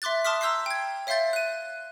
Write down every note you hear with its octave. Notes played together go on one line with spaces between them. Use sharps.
E5 C6 D6 F#6 A6
A5 C6 D6 D#6 F6 B6
A#5 C6 E6 G6 B6 C7
G5 G#6
C#5 E5 F5 C6 G6 A6
F#6 D#7